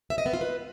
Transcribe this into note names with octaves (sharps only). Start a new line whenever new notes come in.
E5
D#5
B3
F4
B4